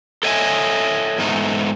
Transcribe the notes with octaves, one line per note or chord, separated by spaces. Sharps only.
A4 C#5 D#5 E5 G5 G#5
E2 G#2 A3 D#4